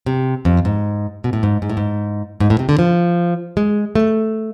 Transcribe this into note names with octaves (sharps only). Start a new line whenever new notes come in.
C3
F2
G#2
B2
A2
G#2
G#2
A2
G#2
G#2
A2
C3
D3
F3
G#3
A3